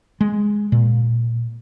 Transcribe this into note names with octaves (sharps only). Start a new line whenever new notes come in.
G#3
A#2